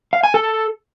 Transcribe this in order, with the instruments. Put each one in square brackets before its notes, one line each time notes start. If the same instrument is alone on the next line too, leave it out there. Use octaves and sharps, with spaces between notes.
[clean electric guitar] F5
G#5
A4